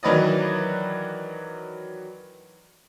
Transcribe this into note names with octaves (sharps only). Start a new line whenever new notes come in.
D#3 E3 F#3 B4 D5 D#5